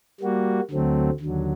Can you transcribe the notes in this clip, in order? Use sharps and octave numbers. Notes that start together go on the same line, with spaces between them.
G3 A#3 F#4
D2 D3 F#3 A3 C4
D#2 D3 F#3